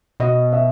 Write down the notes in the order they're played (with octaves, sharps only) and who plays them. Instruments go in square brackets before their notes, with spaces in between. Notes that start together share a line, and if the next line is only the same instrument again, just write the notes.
[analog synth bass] B2 [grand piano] D#5
[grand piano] E5